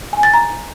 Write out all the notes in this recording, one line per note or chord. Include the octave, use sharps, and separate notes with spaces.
G#5
A6
A#5